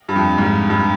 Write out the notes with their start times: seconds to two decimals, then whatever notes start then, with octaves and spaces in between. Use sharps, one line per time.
0.09 G2
0.16 F2
0.38 G#2
0.42 G2
0.70 G2